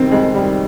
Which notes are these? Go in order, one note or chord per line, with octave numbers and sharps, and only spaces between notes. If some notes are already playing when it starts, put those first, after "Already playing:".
Already playing: F2 C3 D#3 C4
F2 G#3
C3 D#3 G3